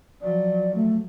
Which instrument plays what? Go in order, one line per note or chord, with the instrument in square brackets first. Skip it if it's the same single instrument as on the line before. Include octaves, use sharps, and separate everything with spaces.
[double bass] F3 F#3 [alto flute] D5
[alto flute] A3